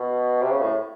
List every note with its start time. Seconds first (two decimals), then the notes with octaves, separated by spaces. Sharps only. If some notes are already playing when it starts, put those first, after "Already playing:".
Already playing: B2
0.41 C3
0.51 C#3
0.61 A2